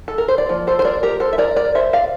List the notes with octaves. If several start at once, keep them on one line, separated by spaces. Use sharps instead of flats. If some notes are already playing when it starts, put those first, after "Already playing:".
A4
A#4
C5
D5
F3 A#3
A4 C5
C5
A#4 D5
G4 A#4
A4 C5
E5
A#4 D5
A#4 D5
C5 E5
D5 F5